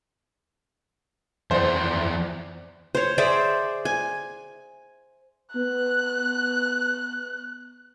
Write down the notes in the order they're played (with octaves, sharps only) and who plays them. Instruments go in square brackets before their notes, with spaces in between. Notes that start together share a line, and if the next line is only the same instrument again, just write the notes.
[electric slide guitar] F2 E3 D5 [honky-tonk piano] C5
[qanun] C5 C#5
G#4 C5 D5 E5
G#5
[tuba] B3 [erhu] F#6